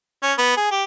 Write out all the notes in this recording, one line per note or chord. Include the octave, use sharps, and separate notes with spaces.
C#4
B3
G#4
G4